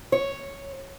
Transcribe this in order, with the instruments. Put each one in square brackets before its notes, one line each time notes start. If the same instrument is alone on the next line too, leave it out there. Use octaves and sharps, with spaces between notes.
[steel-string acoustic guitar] C#5